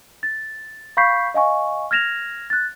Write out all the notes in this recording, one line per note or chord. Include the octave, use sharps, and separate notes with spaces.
A6
F5 B5 C#6 G6 B6 C7
D#5 F5 G#5 C#6
F6 G#6 A#6 E7 F7
F#6 A6